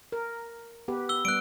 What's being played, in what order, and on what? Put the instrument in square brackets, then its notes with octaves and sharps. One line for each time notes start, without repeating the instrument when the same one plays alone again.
[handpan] A#4
B3 G4 B4
[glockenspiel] E6 G7
[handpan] G3 B3 [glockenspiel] F#6 D7